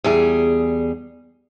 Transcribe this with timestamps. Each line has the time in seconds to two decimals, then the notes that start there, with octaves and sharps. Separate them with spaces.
0.04 E2 G3 G#4